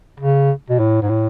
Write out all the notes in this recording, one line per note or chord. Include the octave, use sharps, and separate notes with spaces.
C#3
B2
A2
G#2
A2